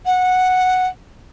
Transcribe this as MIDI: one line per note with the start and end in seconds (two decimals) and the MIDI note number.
0.06 0.87 78